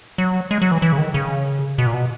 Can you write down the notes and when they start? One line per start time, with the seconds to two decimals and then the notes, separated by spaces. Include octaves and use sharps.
0.18 F#3
0.51 G#3
0.62 F#3
0.71 E3
0.82 E3
0.92 C#3
0.98 D#3
1.14 C#3
1.78 B2
1.86 A#2
1.94 B2